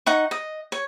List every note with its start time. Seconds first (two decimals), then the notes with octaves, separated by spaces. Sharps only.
0.06 D#4 F#5 C#6
0.31 D#5
0.72 C#5